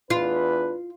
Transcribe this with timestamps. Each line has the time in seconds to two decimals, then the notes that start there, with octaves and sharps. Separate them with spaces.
0.10 E2 D4 F4 B4